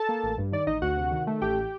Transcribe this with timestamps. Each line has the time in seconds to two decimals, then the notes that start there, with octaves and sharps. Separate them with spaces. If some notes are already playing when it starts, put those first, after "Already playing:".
Already playing: A4 A5
0.09 A#3
0.24 A1
0.38 G2
0.52 D#3 D5
0.67 A1 D#4 D#5
0.82 D2 F#4 F#5
0.97 C3
1.11 D#3
1.27 A3
1.42 A1 G4 G5